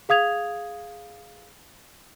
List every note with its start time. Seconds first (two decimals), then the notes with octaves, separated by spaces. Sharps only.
0.09 G#4 F5 D#6 G#6 F7